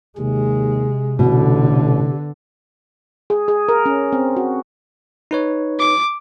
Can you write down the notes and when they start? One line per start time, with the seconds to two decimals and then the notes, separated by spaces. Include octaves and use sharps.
0.18 D#2 C3 G#3
1.19 A1 B2 D3
3.30 G#4
3.48 G#4
3.69 A#4
3.86 C#4
4.12 C4
4.36 F#4
5.31 D#4 B4 C#5
5.79 D6